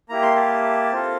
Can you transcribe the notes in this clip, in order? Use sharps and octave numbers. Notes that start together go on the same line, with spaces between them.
A#3 E4 G4 A#5
C6
A5
C4 F4 A4